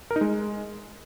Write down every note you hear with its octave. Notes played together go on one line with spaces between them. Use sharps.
A#4
D#4
G#3